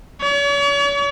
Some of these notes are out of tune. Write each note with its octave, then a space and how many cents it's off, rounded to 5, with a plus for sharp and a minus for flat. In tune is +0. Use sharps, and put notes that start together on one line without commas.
C#5 +40